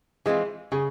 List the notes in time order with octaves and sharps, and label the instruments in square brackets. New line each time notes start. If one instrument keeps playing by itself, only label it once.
[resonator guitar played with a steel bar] E3 G#3 C4 F4 [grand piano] G#4
[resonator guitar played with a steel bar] C#3 [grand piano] G#4